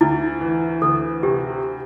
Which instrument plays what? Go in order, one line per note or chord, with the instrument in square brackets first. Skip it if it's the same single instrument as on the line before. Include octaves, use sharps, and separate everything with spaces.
[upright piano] D2 [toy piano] E4
[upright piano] E3
[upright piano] D2 [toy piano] A4
[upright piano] C3 [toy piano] G4